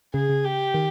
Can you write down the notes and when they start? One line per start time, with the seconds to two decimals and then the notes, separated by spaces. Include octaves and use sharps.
0.14 C#3 G#4
0.29 C#3
0.45 G4
0.74 D#3